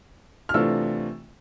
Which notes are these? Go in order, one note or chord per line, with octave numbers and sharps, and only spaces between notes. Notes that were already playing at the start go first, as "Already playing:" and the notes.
F6
C3 E3 A3 D4 F4 E6